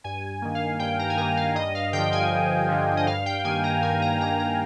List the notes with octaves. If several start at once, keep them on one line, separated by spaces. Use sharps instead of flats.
G2 G#5
D#3 A#3
F5
G2 G5
A#5
G#5
D#3 A#3 A#5
F5
G2 D#5
F5
D3 F3 G5
G#5
G2
D3 F3
D#5
G2 F5
G5
D#3 A#3 G#5
A#5
G2 G#5
A#5
D#3 A#3 A#5
A#5